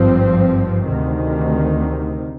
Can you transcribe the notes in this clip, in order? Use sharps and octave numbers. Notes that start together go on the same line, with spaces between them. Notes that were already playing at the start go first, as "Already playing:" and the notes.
Already playing: G#1 G2 F3 C4
D2 C3 D#3